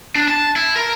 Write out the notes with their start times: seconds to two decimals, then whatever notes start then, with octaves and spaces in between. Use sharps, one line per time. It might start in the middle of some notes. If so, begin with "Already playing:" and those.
0.15 D4
0.28 A5
0.56 E4
0.76 A#4